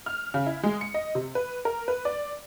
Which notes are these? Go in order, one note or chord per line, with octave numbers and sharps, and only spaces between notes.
F6
C#3
E4
G#3
C#7
D#5
C3
B4
A#4
B4
D5